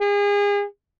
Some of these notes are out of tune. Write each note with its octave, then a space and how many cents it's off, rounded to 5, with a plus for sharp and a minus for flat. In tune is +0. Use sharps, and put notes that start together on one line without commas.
G#4 -35